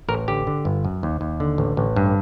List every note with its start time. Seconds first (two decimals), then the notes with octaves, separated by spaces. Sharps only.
0.08 A1 A#4
0.28 D3 G4
0.47 D3
0.65 G1
0.85 F#2
1.03 D#2
1.21 D#2
1.40 D3
1.58 A1
1.77 A1
1.96 G2